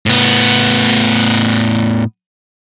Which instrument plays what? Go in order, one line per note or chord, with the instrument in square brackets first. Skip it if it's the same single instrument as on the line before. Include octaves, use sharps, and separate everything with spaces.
[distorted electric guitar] A2 B3